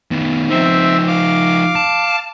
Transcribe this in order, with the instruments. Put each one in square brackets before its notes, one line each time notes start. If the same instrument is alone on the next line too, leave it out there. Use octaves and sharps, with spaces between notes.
[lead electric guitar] D#3 B3
[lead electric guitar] F3 D#4 [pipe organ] C4 E5
[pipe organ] F5 D6
[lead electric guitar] A5